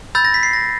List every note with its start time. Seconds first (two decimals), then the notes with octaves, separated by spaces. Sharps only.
0.15 B5 E6 G6 A6
0.25 A#6
0.34 B6
0.43 C7
0.53 A#6